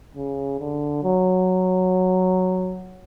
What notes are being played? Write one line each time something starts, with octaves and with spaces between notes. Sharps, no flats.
C#3
D3
F#3